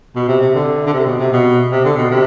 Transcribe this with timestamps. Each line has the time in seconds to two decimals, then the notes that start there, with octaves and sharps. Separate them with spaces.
0.16 B2
0.28 C3
0.42 C3
0.55 D3
0.87 D3
0.94 C3
1.06 B2
1.20 C3
1.33 B2
1.72 C3
1.85 D3
1.98 B2
2.11 C3